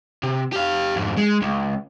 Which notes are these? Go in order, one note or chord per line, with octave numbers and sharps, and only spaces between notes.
C3
G4 F5
F2 G#2
G#3
C#2